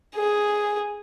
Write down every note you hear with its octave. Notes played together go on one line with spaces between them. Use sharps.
G#4